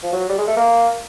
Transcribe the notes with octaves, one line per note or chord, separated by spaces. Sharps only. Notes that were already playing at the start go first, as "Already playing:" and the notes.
F3
F#3
G3
G#3
A3
A#3